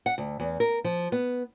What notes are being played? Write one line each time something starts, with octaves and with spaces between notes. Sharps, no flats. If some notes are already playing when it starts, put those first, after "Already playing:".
F#5
D2
E2
A#4
F3
B3